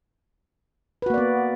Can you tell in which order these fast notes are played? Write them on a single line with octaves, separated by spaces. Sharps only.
B4 F#4 A#3 D5 B3